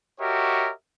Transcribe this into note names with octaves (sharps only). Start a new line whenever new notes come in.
F#4 G4 A#4 C#5 D#5 E5